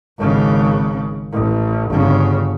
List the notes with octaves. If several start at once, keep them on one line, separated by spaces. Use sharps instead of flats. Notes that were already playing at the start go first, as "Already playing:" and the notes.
G#1 C#3
A1
G1 C#3